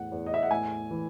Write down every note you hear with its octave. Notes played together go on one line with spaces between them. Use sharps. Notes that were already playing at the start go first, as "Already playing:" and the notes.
Already playing: E2 A2 F#5
E2
D#5
E5
F#5
A2 G#5
E3